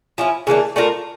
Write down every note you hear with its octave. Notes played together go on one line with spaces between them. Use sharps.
F3 C#4 E4
C#3 E3 A#3 D4
A3 D4 F4 A#4